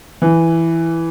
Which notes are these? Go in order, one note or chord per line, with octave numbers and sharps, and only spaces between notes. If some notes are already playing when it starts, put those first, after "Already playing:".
E3